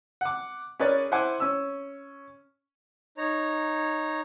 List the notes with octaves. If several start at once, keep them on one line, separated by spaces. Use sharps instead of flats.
F#5 D6
C#4 G#4 A#4 B4 C#5 D5
E4 C5 F#5 G#5 D6
C#4 E6
D#4 C#5 A#5